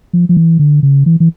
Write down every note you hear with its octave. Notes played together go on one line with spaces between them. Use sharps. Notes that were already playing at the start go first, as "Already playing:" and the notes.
F3
F3
E3
D3
C#3
E3
E3